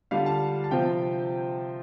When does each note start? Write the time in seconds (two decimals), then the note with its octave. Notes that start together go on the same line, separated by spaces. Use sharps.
0.11 D3 G3 D4 F4 F5
0.26 A5
0.64 A5
0.71 C3 F3 C4 F4 G5